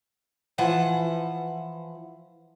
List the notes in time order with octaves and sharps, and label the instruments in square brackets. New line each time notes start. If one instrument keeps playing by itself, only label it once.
[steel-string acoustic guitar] E3 F3 F#5 A5